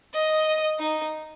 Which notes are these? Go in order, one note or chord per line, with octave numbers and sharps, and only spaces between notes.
D#5
D#4